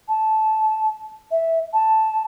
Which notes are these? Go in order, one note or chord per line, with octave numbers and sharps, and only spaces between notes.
A5
E5
A5